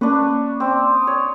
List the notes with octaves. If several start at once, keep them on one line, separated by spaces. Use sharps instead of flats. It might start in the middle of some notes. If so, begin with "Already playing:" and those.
A#3 C#4 D4 B4 C#6
C4 D5
D#6
C#5